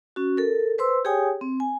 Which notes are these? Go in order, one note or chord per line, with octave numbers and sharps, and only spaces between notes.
C#4 F#4
A4 A#4
B4 C5 C6 E6
G4 G#4 C#5 G5 G#5 D#6
C4
G#5